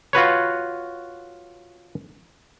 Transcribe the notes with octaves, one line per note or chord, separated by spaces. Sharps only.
F4 F#4 B4 C#5